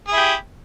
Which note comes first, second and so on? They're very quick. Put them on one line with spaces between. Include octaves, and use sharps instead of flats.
G#4 E4 G4